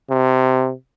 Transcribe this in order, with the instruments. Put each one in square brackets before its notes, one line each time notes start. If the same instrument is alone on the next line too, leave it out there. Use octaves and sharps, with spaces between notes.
[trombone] C3